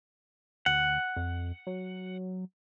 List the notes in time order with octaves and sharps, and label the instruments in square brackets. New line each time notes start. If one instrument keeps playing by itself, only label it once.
[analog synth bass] D2 [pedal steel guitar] F#5
[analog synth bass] F2
F#3